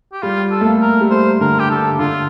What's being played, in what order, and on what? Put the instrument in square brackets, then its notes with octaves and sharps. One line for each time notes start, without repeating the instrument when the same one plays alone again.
[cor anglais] G4
[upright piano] G3 [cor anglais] F4
[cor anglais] A4
[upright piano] A3
A#3
[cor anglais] A#4
[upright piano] G3
[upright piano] A3 [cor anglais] C5
[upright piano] D3 [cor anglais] A#4
[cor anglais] G4
[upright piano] D3 [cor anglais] A4
[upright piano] D3 [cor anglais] F4